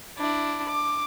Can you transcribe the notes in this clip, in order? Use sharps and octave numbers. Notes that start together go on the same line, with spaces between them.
D4 E4
D6